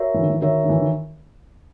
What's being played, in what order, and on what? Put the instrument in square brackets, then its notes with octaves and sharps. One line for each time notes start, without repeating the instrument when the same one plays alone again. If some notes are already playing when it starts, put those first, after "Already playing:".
Already playing: [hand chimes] F#4 A#4 C#5 E5
[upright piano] E3
D#3
E3
[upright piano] D#3 [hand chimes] F#4 A#4 C#5 E5
[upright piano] D#3
E3
D#3